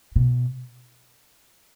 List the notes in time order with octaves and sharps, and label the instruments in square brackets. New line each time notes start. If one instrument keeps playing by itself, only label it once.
[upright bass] B2